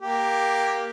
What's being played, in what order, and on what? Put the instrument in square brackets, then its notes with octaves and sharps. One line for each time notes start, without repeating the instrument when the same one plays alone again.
[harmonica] A#3 G4